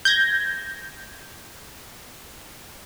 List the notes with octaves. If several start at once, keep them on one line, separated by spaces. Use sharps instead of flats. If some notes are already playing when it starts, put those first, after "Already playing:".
G6 G#6 A#6